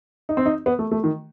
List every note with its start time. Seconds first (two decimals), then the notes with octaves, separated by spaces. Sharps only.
0.29 D#4
0.37 C4
0.46 D#4
0.66 B3
0.79 A3
0.91 A3
1.04 D#3